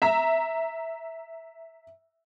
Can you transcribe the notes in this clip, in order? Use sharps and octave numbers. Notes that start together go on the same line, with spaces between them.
E5 A#5 B6